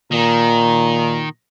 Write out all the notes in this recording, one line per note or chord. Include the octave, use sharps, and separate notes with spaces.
A#2 D#3 A#5